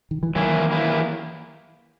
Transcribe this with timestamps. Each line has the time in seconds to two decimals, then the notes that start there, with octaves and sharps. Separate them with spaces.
0.11 D#3
0.23 E3
0.35 D#3 E3 F#3 A#3 E4
0.71 E3 A#3 E4